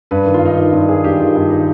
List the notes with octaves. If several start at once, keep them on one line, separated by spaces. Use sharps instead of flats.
G2 B4
D#3
F4
G2 D#4
D#3 D#4
G2 F4
D#3 G#4
G2 G4
D#3 F4
G2 D#4
D#3 D#4